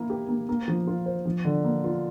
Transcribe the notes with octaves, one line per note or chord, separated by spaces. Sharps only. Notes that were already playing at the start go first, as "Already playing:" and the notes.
Already playing: A#3 E4
G4
A#3
A#3
F3
F4
C5
F3
D3
A#3
F4